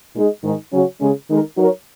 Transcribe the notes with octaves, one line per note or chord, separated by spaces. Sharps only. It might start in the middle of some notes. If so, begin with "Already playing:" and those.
A#2 G#3 D#4 G#4 D#5
G#2 D#3 G#3 D#4
C#3 F#3 C#4 F#4 C#5
C#3 G#3 C#4 G#4
D#3 G#3 D#4 A#4
F#3 D#4 F#4 A#4 C#5